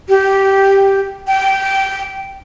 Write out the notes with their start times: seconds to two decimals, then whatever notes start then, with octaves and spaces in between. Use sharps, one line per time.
0.09 G4
1.27 G5